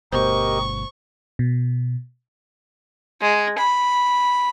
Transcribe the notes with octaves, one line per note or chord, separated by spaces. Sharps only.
G1 B2 A3 G4 A#4 C5 D#5 C#6
B2
G#3
B5